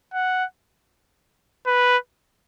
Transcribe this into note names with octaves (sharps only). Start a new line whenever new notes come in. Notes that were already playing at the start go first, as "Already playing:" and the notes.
F#5
B4